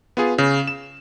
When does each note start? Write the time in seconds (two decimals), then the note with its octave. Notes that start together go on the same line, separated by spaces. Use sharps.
0.17 B3 F4 G#4
0.38 C#3
0.67 E7